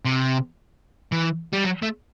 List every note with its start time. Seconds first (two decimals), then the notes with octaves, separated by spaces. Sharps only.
0.05 C3
1.12 E3
1.53 G3
1.64 F#3
1.82 A3